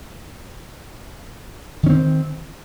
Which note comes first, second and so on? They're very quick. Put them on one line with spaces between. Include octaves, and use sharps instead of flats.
D#3 C#4 C4